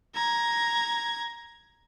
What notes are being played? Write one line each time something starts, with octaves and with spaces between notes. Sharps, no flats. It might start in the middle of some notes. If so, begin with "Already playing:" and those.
A#5 G#6